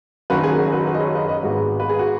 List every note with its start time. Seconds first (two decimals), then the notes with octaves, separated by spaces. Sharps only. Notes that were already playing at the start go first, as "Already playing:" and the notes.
0.30 F#1 F#2 D#3 F#4 B4
0.43 G#4
0.59 F#4
0.68 G#4
0.72 F#4 B4
0.86 F#4 B4
0.94 D#5
1.00 G#4 C#5
1.15 B4 D#5
1.28 B4 D#5
1.43 G#1 G#2 G#3 B3 F#4
1.80 B4
1.89 G#4
1.99 F#4